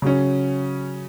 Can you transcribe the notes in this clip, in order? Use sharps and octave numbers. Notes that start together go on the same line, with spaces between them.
C#3 F#3 C#4